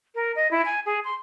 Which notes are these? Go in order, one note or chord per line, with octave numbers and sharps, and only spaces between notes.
A#4
D#5
E4
G#5
G#4
C6